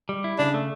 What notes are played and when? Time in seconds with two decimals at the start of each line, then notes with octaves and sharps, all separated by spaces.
0.09 G3
0.24 E4
0.38 C#3 D4
0.54 A3